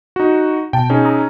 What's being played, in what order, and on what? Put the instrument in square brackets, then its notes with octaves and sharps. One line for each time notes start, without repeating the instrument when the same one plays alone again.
[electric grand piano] D#4 F#4
[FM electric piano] B2 A5 [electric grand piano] G5
[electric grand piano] C#4 D#4 G#4
[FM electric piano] A#5 D#6 E6